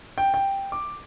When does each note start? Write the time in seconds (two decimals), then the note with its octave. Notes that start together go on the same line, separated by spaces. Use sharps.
0.18 G5
0.34 G5
0.72 D6